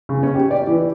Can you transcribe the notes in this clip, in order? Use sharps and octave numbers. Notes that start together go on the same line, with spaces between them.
C#3
C#4
G4
D5
E3